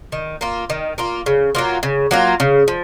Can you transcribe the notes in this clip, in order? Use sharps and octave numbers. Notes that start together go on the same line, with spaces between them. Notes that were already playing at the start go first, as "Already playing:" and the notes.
D#3
A#3 F4
D#3
A#3 F4
C#3
F#3 A#3 F4
C#3
F#3 A#3 F4
C#3
F3